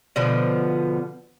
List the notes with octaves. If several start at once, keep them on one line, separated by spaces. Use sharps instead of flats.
B2 D3 F3 B3